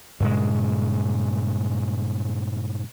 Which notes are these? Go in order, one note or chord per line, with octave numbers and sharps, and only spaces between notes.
G2 A#2 C#3 G#3